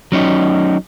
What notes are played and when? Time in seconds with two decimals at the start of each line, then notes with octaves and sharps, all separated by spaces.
0.12 F#3 C#4 D#4